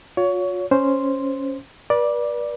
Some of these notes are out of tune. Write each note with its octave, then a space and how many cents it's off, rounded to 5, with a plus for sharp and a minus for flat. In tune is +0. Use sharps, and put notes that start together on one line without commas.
F4 +45 C#5 +25
C#4 +0 C5 +0 C6 +0
B4 -40 D5 +0